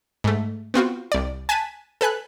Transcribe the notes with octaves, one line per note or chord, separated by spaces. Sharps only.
G#2 A3
B3 C4 F4 F#4
C2 D5
G#5 A5 F#6 B6 D#7
A4 B4 G#5 F#6